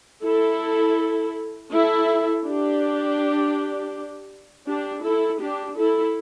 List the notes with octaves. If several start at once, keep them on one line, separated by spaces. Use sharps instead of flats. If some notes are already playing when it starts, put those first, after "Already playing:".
E4 A4
E4 A4
D4 G4
D4 G4
E4 A4
D4 G4
E4 A4